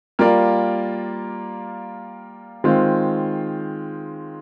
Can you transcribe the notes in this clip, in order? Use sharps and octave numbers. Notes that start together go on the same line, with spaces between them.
G3 A#3 F4 A#4 D5
D#3 G#3 C4 F4 C5